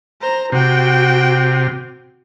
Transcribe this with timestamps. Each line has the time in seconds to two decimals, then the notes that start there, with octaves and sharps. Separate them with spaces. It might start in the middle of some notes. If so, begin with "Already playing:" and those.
0.22 C5 A#5
0.52 C3 F#4 G5